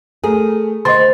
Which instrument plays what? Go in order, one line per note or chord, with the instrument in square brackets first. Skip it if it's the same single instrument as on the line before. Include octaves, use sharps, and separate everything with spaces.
[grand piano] A3 A#4 [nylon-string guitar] G#4
[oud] D2 D#3 C5 [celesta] D#5 A6 [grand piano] C6